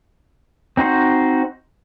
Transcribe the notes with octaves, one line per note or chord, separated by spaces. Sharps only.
C4 D#4 F#4 C5